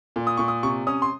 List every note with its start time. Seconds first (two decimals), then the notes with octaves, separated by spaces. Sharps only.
0.16 A#2
0.27 D#6
0.37 A#2 C#6
0.48 D#6
0.63 C3 C#6
0.87 C#4 D#6
1.02 C6